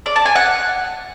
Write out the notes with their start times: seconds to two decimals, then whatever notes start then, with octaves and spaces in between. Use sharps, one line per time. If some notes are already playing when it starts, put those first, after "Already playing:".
0.06 D5
0.16 A5
0.26 G#5
0.35 F#5